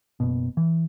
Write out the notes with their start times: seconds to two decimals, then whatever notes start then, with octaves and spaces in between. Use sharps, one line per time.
0.20 F#1 B2
0.57 E3